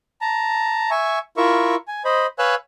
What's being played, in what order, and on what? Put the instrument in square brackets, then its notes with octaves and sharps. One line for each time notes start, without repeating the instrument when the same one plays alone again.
[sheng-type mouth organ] A5 A#5
E5 G#5 C#6
E4 F4 A#4 E5 C#6
G#5
C5 D#5 B5
B4 C#5 F5 G#5 E6 F#6